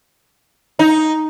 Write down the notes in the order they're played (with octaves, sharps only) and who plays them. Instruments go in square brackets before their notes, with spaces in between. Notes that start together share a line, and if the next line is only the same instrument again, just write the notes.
[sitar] D#4